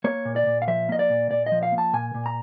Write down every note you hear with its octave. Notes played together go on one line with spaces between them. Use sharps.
A#3 C#5
A#2
D5
A#2
F5
F3 E5
A#3 D#5
D5
A#2
A#2 D5
D#5
F3
F5
A#3
A5
A#2 G#5
A#2
A#5